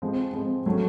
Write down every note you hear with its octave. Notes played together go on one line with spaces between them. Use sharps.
F3 G#3 C4
F3 G#3 C4
F#3 A3 C#4